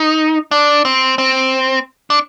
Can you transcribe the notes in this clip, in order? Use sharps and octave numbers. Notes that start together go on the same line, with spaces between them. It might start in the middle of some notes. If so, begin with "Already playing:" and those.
Already playing: D#4
D4
C4
C4
D4